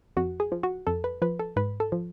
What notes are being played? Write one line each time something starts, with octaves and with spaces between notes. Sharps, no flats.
F2 F#4
G#4
F3
F#4
F2 A4
B4
F3 B4
A4
G#2 B4
A4
F3